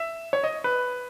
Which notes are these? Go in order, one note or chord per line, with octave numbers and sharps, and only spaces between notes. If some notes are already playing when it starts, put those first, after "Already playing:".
Already playing: E5
C#5
D#5
B4